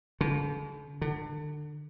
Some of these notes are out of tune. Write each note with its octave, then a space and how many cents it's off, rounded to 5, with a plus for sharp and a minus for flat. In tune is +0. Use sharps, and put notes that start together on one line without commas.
D3 -40
D3 +30